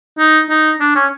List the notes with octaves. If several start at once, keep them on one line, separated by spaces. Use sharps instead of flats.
D#4
D#4
D4
C#4